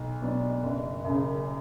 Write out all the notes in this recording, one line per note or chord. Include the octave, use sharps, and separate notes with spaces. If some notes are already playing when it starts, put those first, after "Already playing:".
Already playing: B1
B2 F#3 B3 D4
F#1
F#2
C#3